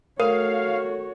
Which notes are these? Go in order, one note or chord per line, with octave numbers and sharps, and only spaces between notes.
A3 F#4 A#4 C#5 F5